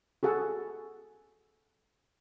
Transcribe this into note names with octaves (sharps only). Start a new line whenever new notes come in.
F#4 G#4 A4 F#5